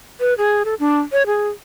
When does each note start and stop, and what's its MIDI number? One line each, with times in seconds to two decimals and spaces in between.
0.20 0.34 71
0.38 0.63 68
0.65 0.75 69
0.80 0.99 62
1.12 1.26 73
1.26 1.49 68